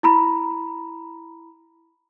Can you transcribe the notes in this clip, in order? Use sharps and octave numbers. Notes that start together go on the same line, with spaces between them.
E4 A#5 B5